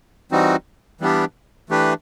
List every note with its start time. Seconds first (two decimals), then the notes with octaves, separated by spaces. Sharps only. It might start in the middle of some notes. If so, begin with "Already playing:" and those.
0.32 E3 G3 C4 D#4 F#4
1.01 E3 G3 B3 D4 G4
1.70 E3 A3 D4 G4 B4